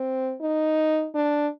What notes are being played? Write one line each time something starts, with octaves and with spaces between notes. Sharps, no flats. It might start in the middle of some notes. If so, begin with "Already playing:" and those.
Already playing: C4
D#4
D4